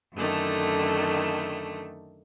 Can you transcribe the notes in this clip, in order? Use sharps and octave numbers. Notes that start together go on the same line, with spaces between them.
F#2 D3 D#3 A3